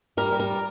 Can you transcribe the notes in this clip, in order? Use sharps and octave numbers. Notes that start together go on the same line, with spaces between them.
G3 A#4
G3
A#4